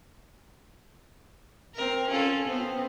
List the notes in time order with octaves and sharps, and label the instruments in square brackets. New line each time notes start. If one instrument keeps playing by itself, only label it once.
[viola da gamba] C4 A#4
C#4 F4 A4
B3 C4